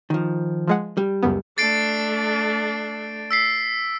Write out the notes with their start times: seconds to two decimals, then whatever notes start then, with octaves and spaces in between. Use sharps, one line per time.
0.10 D#3 F3
0.68 F3 G#3 F#5
0.97 G3
1.23 C#2 F#2 B3
1.58 A3 D4 A6 C7 D7
3.31 E6 B6 C7